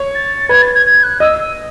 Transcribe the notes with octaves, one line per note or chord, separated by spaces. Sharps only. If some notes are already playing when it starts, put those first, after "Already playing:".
Already playing: C#5
A6
B4 G#6
A6
G#6
G#6
F#6
D#5 E6
E6